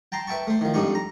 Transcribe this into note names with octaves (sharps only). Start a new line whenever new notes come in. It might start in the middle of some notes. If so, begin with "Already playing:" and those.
G5 A5 A#5 C6
B4 E5 G5 A5 C#6
A3 C5
D#3 F3
F2 G#2 G3 D4 D#4 C#6
A#5